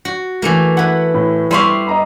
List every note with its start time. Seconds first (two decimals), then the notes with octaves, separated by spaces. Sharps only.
0.05 F#4
0.42 E3 A3 A#3
0.77 E4 B4 F#5
1.14 A2
1.51 G3 E4 E5 F5 C6 C#6
1.87 D#5 A#5 B5